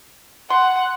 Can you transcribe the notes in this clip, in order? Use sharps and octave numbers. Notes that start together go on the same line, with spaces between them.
F#5 C6